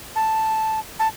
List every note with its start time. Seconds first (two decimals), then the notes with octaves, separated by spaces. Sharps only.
0.16 A5
0.99 A5